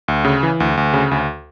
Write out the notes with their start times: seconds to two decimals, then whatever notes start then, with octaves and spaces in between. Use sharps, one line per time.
0.08 D2
0.25 C#3
0.43 E3
0.60 D2
0.77 D2
0.94 C#3
1.11 D2